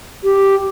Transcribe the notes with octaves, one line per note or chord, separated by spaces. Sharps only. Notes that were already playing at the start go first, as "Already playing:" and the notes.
G4